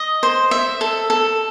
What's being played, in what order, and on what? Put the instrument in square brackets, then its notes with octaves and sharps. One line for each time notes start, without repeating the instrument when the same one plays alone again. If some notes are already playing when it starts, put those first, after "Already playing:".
Already playing: [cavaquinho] D#5
C5
E5
A4
A4